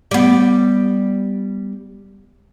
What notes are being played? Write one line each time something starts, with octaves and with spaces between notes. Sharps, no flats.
G3 B3